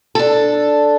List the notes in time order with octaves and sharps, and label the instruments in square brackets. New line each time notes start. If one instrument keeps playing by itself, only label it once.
[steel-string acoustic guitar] D4 A4